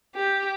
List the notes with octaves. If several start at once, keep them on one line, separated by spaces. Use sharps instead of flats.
G4